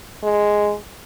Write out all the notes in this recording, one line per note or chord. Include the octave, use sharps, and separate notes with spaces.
G#3